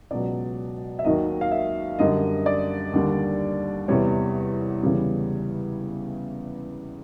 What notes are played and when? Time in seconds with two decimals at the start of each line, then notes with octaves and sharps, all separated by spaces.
0.11 C#2 B2 F#3 D5
0.99 E5
1.04 D#2 D#3 F#3 D#5
1.41 F5
1.51 E5
1.99 F#2 D3 G3 D#5
2.46 D5
2.93 D#2 D3 G3
3.88 E2 C3 E3 G3 C#5
4.83 E2 C#3 E3 G3